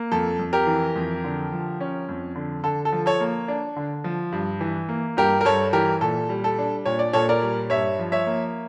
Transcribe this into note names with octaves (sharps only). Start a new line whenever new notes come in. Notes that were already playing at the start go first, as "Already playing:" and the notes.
Already playing: A#3
F2 A4
F2
G4 A#4
E3
F2
D3
F3
C#4
F2
D3
D3 A4
A4
F3
A4 C#5
A#3
D4
D3
F3
G2
E3
A#3
G2 G4 A#4
A#4
G2 A4 C#5
E3 G4 A#4
A#2 A4
G3
A4
D4
A#2 C#5
D5
A#2 A4 C#5
A#4 D5
G3
G2 C#5 E5
F3
C#5 E5
A#3